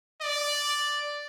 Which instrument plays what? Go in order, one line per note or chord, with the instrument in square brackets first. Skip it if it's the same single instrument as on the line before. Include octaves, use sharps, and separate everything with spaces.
[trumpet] D5